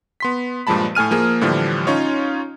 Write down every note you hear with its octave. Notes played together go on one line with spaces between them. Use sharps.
B3 C6 B6
G2 A#2 F3 G#3 A5 B5
A2 A3 G#5 F6 D#7
F3 A#3 G#4
A2 D3 E3 F3 G3
C#4 D#4 F4 C#5